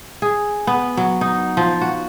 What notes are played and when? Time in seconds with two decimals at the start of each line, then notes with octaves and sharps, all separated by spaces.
0.22 G#4
0.67 B3
0.97 F#3
1.21 D#4
1.57 F3
1.81 F#4